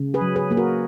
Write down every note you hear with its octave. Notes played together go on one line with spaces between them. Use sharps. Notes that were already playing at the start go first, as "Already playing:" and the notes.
Already playing: C#3
G#4 B4
F#3
G#4 B4
A#3 G#4
F#4 A#4